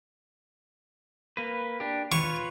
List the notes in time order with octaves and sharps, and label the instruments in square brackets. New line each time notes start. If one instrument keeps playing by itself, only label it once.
[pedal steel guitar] A#3 B4
D4 G4
[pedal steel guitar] F4 B4 C#5 [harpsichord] C#6